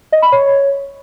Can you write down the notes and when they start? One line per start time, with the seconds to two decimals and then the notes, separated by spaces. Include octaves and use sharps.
0.12 D#5
0.22 B5
0.32 C#5